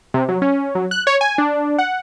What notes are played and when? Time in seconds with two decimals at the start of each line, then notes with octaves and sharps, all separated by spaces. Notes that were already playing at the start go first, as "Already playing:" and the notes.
0.14 C3
0.29 F#3
0.42 C#4
0.75 F#3
0.91 F#6
1.07 C#5
1.21 G#5
1.38 D4
1.78 F#5